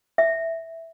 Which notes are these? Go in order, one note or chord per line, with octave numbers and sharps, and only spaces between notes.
E5